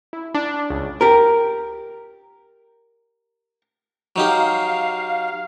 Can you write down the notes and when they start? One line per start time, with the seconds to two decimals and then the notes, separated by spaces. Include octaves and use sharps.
0.13 E4
0.34 D4
0.70 C#2
1.01 G4 A#4
4.16 F#3 D#4 G4 F5